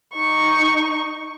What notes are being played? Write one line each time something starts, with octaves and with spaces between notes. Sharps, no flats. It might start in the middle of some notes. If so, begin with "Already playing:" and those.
D#4 C#6